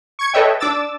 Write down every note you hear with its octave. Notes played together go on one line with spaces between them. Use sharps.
C#6 G#6 C#7
A4 B4 C#5 D#5 E5 G5
D4 D6 E6 A6